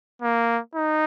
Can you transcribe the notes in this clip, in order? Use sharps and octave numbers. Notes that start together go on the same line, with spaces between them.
A#3
D#4